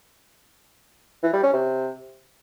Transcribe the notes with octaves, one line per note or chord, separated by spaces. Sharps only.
E3
G3
C#4
C3